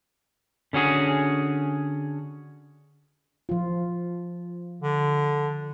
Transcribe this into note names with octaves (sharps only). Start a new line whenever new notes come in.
D3 C#4 F#4 G#4 C#5
F3 F4
D3